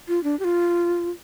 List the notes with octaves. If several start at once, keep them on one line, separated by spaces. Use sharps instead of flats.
F4
D4
G4
F4